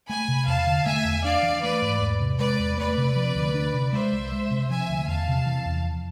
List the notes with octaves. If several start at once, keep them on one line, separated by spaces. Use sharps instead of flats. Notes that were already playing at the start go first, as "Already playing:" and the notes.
A3 G#5 B5
C3
E2 F5 A5
D3
A3 E5 G#5
E2
D4 D5 F5
E3
A3 B4 D5
G#2
E2
C3
G#3 B4 D5
E2
A3 B4 D5
C3
F3
D2
D4
C3
G#3 C5 E5
C2
G#3
C3
F3 E5 G#5
D2
E2 F5 A5
C3
E3
E2
F2